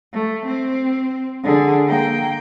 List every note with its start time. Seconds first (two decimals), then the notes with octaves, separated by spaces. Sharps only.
0.14 A3
0.47 C4
1.44 D3 G#4
1.87 A#3 G5